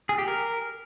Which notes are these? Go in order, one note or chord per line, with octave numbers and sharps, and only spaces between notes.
G#4
G4
A#4